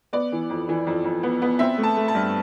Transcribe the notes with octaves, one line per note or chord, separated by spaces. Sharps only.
B3 D5
E3
F2
E3
F2
F2
B3
B3
C4 E5
A3
A5
A3
A5
G2